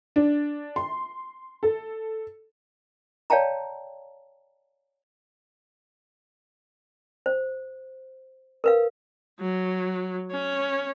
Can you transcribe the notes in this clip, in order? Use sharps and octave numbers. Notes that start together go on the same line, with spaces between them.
D4
C6
A4
C#5 D5 F5 G5 A5 A#5
C5
A#4 B4 F5
F#3
C#4